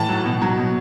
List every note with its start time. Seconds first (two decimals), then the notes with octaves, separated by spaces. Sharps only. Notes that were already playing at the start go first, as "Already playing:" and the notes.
Already playing: A2 E3 A5
0.09 F#3
0.25 B2
0.41 F#3
0.58 B2